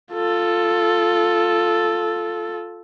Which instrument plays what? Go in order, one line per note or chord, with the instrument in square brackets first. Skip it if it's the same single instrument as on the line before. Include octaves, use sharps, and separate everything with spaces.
[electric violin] F4 A4